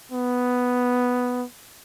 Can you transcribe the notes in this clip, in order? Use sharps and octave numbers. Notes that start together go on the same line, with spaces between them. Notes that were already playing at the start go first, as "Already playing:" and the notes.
B3